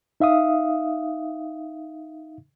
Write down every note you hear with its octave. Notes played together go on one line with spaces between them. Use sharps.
D#4 E5 F5 D#6